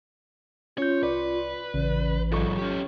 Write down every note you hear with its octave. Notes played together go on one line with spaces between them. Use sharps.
C#4 F4 C#5 G6
C2 B4 D5
A1 C#3 D5
B1 G#2 F#3 F4 A4 C#6
C#4 G4